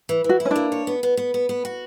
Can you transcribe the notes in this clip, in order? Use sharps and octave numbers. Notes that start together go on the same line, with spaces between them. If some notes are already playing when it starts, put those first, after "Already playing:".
E3
E3
F#4
E4
C#4
A#3 D4
C#5
B3
B3
B3
B3
B3
F#4